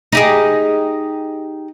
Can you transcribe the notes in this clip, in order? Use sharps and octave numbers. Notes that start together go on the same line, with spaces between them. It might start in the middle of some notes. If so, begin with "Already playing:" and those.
D#4 G4 G#4